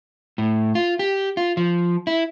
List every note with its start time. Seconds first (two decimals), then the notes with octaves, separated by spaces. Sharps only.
0.38 A2
0.75 F4
0.99 G4
1.37 F4
1.57 F3
2.07 E4